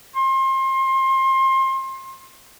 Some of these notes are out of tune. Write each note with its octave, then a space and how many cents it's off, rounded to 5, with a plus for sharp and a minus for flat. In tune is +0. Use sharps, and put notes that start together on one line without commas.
C6 +30